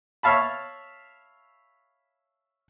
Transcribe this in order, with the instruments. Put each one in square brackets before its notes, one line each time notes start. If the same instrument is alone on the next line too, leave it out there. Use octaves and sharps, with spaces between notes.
[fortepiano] C#5 E5 F5 A5 B5